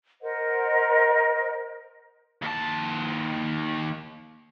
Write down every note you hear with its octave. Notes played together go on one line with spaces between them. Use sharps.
A#4 C5 D#5 F#5
D#2 A5